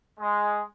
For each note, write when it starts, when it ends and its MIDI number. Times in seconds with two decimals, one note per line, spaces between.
0.18 0.61 56